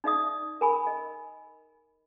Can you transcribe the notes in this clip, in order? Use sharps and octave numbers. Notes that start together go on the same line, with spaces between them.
D#4 D5 E5 D#6
A#4 G#5 B5
D#5